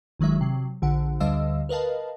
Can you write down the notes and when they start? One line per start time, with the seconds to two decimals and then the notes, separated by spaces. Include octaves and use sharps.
0.19 G1 D#3 F#3 G#3 E5
0.41 C3 F#3
0.82 A#1 D3 F#5
1.20 D2 D3 G3 D#5 F5 E6
1.69 A#4 B4 D#5 F5 A5